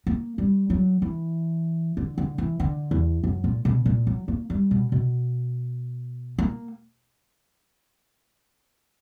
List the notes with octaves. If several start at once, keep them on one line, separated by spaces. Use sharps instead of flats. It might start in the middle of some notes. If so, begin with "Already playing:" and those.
A#3
G3
F#3
E3
D3
D3
E3
D3
E2
F#2
A#2
B2
A#2
F#3
A#3
G3
B2
B2
A#3